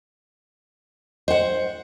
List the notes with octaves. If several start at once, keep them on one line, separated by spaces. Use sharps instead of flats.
C5 D#5 F#5